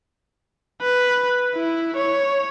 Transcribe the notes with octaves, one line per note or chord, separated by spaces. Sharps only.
B4
E4
C#5